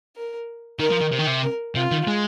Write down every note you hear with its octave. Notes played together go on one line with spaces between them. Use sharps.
A#4
D#3 A#4
F3
D#3
C3
D#3
C3
A#4
C3 F4
D#3
G#3